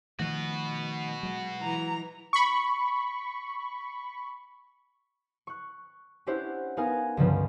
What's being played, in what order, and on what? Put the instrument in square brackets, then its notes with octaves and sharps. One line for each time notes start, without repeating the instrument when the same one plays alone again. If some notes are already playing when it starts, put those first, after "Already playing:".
[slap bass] D#3 F3 A3 [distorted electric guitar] F#4 B4
[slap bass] F#3 G#3
[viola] E3 A#5
[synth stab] B5 C#6
[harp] C#6 F#6
C#4 D4 E4 G4 C5 F#5
B3 D#4 A#4 F5 F#5 G#5
C#2 G2 D3 F3 G3 C#4